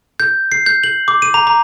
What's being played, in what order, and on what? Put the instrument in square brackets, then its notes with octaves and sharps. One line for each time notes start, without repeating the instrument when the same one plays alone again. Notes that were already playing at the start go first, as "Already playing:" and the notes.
[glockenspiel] G6
C7
G6
F#7
D6
D#7
A#5
A#5